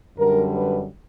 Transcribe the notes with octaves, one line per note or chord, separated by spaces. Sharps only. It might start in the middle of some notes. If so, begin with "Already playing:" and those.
F#2 D3 G3 A#4
B4